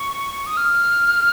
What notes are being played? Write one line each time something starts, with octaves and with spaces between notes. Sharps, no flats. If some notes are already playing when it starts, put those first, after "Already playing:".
Already playing: C#6
D#6
F6